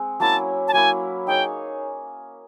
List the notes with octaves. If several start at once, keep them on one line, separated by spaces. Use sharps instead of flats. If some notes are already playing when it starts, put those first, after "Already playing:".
Already playing: G#3 C4
F#3 A#3 C#4 E4 A5
A5
F#3 A#3 C#4 E4 G#5
D#4 G#4 C#5 G5